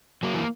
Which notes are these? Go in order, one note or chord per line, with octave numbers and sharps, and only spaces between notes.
F#3 A#3
E3